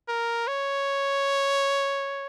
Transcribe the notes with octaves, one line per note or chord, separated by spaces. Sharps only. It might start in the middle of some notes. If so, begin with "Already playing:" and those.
A#4
C#5